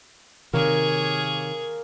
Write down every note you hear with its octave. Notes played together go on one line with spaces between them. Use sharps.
C3 D#3 A#3 G#4 A#4 C#5